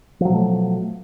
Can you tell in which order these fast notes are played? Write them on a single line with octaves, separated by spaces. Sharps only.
F3 F#3 B2 A3